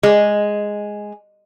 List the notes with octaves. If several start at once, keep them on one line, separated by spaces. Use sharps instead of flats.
G#3